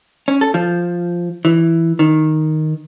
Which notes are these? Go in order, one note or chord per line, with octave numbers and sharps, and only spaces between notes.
C#4
A4
F3
E3
D#3